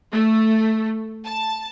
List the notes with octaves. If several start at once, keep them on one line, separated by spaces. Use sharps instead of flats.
A3
A5